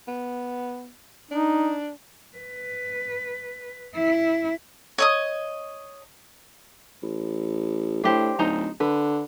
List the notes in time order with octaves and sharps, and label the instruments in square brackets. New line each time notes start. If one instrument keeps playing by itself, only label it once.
[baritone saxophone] B3
[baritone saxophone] D4 [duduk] D#4
[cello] B4
E4
[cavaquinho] C#5 D#5 D#6
[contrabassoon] A1
[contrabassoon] A2 [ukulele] D4 G4 C5
[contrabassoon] D1 [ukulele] D#4 C5 A#5
[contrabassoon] D3 [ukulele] B4